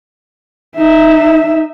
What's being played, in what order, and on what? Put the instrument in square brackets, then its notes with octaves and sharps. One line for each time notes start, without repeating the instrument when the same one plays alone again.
[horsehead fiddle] D#4 E5